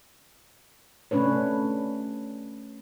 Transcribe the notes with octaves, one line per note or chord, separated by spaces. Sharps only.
C3 A3 C#4 D4 B4 C#5